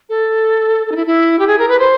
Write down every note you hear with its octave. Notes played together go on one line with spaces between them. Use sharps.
A4
A4
D#4
E4
E4
G4
G#4
A#4
B4
C5